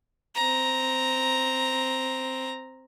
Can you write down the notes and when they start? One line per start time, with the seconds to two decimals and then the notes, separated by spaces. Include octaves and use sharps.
0.35 C4 A#5